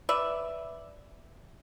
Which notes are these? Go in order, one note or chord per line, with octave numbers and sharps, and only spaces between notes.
B4 D5 E5